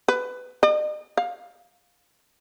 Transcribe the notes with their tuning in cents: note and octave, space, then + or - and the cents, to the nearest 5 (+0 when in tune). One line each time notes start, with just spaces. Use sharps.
B4 +20
D#5 -45
F5 +20